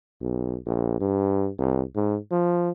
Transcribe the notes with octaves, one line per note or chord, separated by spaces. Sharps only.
B1
A#1
G2
C2
G#2
F3